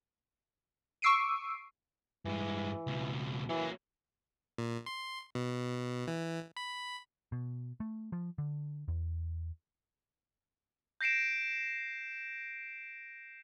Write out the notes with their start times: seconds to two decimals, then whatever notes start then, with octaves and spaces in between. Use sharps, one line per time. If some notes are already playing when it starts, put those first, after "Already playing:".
1.02 C#6 D6 E6 C7 D7 D#7
2.25 G2 E3 G#3
2.87 C#2 B2
3.49 E3 F#3 A#3
4.58 A#2
4.86 C6
5.35 B2
6.08 E3
6.57 B5
7.32 B2
7.80 A3
8.12 F3
8.38 D3
8.88 E2
11.01 G6 A#6 C7 D7 E7